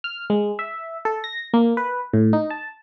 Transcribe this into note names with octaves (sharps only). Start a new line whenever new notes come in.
F6
G#3
E5
A4
A#6
A#3
B4
A2
D#4
A5